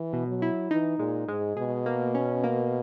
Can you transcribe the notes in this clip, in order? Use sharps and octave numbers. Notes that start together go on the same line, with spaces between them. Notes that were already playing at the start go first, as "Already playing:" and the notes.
Already playing: E3
B2
F#3
E4
E3 D#4
A#2 G#3
G#2 G#3
B2 G#4
A#3
C#4
A#3